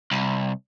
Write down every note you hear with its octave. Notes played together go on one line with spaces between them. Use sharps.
C2